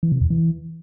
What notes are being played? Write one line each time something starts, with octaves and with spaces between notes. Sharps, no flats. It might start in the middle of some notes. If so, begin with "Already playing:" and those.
E3
C3
E2
E3